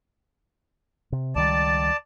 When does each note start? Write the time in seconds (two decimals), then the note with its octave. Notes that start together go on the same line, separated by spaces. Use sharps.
1.12 C3
1.36 C#2 D#3 G3 D5 A5